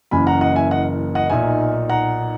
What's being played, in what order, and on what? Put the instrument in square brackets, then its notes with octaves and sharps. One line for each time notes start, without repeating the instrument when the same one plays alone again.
[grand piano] F#1 F#2 E3 A#3 G#5 B5
F#5 A#5
D#5 F#5
E5 G#5
D#5 F#5
D#5 F#5
B1 A#2 A#3 D#4 E5 G#5
F#5 A#5